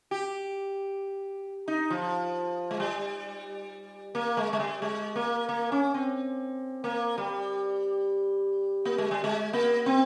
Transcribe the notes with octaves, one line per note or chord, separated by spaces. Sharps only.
G4
D#4
F3
G#3
G3
A#3
G#3
G#3
G3
G#3
A#3
A#3
C#4
C4
A#3
G3
A#3
G#3
G3
G#3
A#3
C4